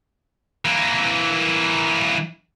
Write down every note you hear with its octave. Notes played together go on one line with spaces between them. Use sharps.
E3 A#3